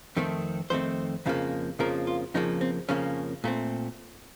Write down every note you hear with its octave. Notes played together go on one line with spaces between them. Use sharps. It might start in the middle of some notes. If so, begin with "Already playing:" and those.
F2 D#3 A3 C4
F2 D#3 A3 C4 C5
F2 C#3 F3 A#3
F2 C#3 F3 A#3 A#4
F4
F2 C#3 F3 A#3 D#4
C4
F2 C#3 F3 A#3 C#4
A#2 A3 C4